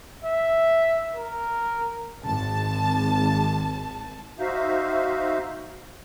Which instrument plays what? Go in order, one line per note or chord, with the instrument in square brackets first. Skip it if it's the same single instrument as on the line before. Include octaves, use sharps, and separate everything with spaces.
[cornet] E5
A#4
[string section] G#1 A5
[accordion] D#4 F#4 C5 E5 F5